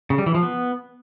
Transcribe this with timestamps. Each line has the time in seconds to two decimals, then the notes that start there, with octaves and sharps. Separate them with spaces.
0.10 C#3
0.18 G3
0.26 E3
0.35 F3
0.43 B3